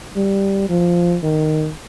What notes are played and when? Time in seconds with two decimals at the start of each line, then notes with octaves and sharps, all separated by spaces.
0.16 G3
0.69 F3
1.23 D#3